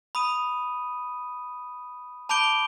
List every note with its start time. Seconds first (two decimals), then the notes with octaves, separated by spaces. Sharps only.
0.15 B5 D#6 D#7
2.29 A5 B5 D6 G6 D7 G7